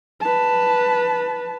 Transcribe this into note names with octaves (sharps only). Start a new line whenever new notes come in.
B4 A5